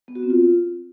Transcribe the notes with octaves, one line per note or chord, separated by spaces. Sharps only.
B3
F#4
C4
F4